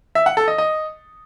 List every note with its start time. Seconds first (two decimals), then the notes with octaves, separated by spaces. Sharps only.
0.15 E5
0.26 F#5
0.37 A4
0.48 D#5
0.58 D#5